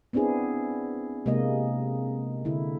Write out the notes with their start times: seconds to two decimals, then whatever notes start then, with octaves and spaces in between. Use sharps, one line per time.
0.13 B3 C4 D4 E4 G#4
1.26 C3 G#3 A#3 D#5
2.45 D3 E4